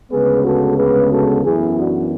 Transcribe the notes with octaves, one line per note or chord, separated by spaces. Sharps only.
D2 C#3 G#3 B3 G#4 B4
F#4 A4
G#4 B4
F#4 A4
F#2 E3 B3 E4 G#4
D4 F#4